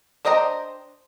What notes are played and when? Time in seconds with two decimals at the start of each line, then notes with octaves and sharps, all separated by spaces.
0.25 D4 C5 D#5 G5 A#5